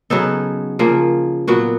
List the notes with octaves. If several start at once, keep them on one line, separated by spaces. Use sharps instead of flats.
C#3 F#3 B3 D#4 A4
C#3 F3 A#3
A#2 F#3 B3 F#4